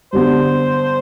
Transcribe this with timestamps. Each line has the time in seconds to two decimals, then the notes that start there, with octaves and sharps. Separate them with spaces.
0.13 G2 D3 G3 B3 C5